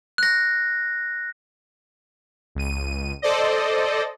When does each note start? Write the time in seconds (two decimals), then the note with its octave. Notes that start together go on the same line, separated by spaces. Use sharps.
0.18 F#6 A#6
2.55 C#2 D#7
3.22 A4 C5 D5 D#5